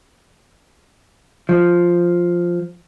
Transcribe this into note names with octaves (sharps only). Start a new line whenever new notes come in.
F3